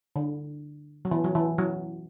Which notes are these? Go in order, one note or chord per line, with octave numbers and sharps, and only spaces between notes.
D3
F#3
E3
F#3
E3
F#3